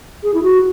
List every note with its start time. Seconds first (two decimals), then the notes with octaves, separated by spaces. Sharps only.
0.24 G#4
0.34 E4
0.43 F#4